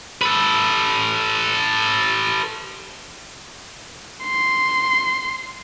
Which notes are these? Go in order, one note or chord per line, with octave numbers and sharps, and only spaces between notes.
A4 B4
C6